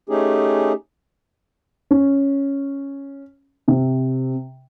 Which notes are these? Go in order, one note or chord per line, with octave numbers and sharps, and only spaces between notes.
A3 C#4 D#4 G4 G#4
C#4
C3